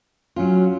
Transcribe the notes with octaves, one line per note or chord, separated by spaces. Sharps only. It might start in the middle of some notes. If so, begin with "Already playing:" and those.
F#3 C#4 F4